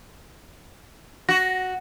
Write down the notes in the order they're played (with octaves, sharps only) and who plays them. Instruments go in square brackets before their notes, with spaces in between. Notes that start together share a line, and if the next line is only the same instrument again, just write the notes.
[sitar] F#4 [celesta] A#6